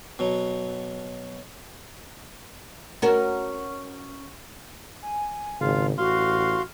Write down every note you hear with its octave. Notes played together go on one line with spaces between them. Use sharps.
B2 F#3
C#4 F#4 A#4
G#5
G#1 C#3 F4 F5
A1 F#4 F5 C6 F6